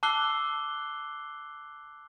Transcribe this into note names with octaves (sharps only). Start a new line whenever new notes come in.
A5 D6 E6 F#6 C7 G7